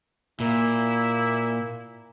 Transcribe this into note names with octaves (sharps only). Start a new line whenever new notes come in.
A#2 A#3 E4